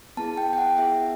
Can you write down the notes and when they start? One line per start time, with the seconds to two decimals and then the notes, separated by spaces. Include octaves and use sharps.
0.17 B3 E4 G#4 A5
0.38 G5
0.53 G5
0.58 F#5
0.78 B3 E4 G#4 E5